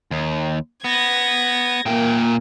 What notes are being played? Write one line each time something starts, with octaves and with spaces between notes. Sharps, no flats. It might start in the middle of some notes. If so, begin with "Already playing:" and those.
D#2
B3 G#6 A#6
A#2 A#3 G5